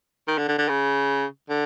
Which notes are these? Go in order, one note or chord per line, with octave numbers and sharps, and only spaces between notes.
D#3
D3
D3
D3
C#3
D3